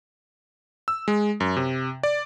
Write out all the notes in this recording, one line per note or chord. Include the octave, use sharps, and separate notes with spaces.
E6
G#3
F#2
C3
D5